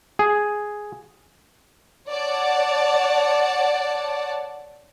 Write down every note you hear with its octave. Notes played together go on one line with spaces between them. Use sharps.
G#4
C#5 D5 F#5 A5